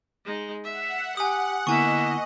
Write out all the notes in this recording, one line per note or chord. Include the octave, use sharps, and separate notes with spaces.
G#3 D#4
E5 F#5
G4 G#5 D#6
D3 A#3 B3 E4 D#5 E5 G#5 C#6